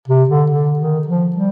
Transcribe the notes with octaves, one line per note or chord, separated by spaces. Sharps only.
C3
D3
D3
D#3
F3
G3